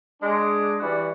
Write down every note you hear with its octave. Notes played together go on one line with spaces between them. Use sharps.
G#3 D4
E3 G3 F#4 D5